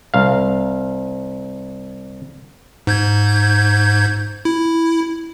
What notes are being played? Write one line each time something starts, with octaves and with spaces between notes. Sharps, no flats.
C2 F5
G#2 G6 G#6
E4